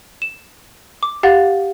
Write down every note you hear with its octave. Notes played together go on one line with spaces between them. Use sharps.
E7
D6
G4 F5 F#5 A6